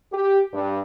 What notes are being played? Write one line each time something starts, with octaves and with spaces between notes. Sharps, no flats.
G4
G2